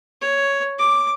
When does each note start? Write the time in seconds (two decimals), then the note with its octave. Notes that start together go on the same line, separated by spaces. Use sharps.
0.22 C#5
0.79 D6